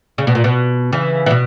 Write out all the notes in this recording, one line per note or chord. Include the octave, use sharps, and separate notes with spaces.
C#3
B2
A#2
B2
C#3 E3
E3
B2